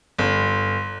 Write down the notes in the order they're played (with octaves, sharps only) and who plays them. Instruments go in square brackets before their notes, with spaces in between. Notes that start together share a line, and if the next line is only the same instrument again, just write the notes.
[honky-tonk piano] G1